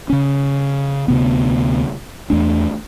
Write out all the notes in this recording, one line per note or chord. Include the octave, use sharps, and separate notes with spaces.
C#3 C#4
D2 C3 B3
E2 A3 D4